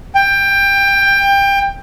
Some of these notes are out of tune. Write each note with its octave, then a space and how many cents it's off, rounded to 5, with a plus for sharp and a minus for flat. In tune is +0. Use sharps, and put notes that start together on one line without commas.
G5 +20